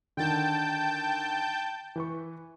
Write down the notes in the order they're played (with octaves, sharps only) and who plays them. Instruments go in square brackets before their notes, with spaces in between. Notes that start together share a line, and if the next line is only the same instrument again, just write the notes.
[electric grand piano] D3 D#3 [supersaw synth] G5 A5 G6
[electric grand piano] E3 B4 C#6